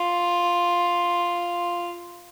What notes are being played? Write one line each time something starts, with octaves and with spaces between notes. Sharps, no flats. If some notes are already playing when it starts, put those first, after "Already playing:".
Already playing: F4